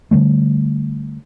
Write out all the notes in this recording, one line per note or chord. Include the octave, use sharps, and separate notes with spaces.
D3 D#3 G3 A3